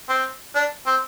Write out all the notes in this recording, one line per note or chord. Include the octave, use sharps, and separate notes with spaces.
C4
D4
C4